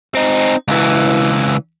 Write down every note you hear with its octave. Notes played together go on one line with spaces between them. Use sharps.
C4 D#4
C#2 E3